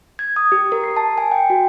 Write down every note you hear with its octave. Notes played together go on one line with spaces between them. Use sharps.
G#6
D#6
G4
A#4
C7
A5
G#5
G5
F#4